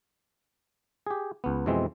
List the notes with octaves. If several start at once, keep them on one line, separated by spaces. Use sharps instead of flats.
G4 G#4
C#2 B3
F2 B2 E3 G#3 C4